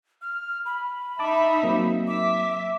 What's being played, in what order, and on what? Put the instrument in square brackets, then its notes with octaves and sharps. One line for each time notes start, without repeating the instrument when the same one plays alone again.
[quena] F6
B5
[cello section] D#4 E5 [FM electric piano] A5 D6
[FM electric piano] F#3 A#3 C4
[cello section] E5 [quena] D6